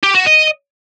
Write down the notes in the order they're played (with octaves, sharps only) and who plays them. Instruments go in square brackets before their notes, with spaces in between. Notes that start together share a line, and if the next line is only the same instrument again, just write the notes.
[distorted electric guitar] G4
F#4
D#5